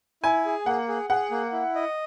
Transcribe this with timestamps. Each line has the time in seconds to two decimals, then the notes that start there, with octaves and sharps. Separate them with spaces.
0.23 E4 G#5
0.45 G#4
0.66 A#3 F#5
0.88 G#4
1.10 G#4 F#5
1.31 A#3
1.53 E4
1.75 D#5